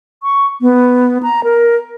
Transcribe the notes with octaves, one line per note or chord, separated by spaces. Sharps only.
C#6
B3
A#5
A#4